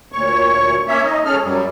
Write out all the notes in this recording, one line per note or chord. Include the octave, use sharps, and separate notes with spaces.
D2 A#2 C#5 C#6
A#3 C#4 C#5 E5
D#4 D#5
C#4 G#4 A4 F6
F#2 F#3 G3